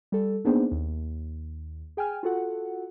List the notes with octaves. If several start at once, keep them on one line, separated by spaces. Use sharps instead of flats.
G3 A4
A#3 B3 D4 D#4 G#4 C5
D#2
G#4 G5 G#5 F6
F4 F#4 A4 F#5